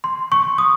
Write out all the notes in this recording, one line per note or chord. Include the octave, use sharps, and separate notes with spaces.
C6
C#6
D#6